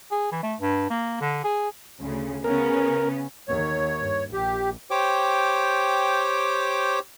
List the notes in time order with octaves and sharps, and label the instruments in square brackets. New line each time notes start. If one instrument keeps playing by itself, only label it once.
[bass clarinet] G#4
E3
A3
G2
A#3
D3
G#4
[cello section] D2 C#3
[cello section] C#3 B3 C#4 [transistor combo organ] A#4
[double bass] D#2 D#3 [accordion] C#5
[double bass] G2
[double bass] A#1 [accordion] G4
[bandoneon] G4 C5 C#5 G5 D6